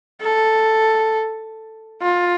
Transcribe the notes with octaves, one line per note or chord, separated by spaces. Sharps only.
A4
F4